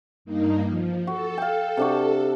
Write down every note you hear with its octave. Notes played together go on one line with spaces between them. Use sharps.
G2 A#3 D#4
F3
F#4 A4
F5 G5
C3 D4 F#4